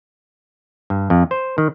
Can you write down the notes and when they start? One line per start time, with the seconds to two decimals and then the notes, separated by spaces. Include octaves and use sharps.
0.90 G2
1.10 F2
1.31 C5
1.58 D#3